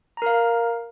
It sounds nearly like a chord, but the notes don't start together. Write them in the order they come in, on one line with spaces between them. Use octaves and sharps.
A#5 A#4 F5